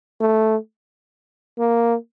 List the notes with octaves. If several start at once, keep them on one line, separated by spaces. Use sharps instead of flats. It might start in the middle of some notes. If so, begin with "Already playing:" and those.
A3
A#3